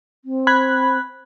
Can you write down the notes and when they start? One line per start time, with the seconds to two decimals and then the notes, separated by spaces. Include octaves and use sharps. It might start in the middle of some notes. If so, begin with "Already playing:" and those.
0.25 C4
0.47 B5 F#6 G#6